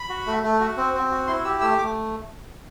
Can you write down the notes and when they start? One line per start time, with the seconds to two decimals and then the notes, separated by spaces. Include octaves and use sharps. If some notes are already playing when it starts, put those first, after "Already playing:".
Already playing: B5
0.09 F#4
0.27 A3
0.43 A3
0.61 F#4
0.77 C4
0.94 C4
1.11 F#4
1.27 E4 C6
1.44 G4 E6
1.61 A3 E6
1.78 A3 D6